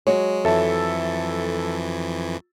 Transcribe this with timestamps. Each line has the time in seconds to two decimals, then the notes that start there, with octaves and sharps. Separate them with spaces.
0.07 F#3 G#3 F#4 C#5
0.45 F2 E3 A4 E5 A5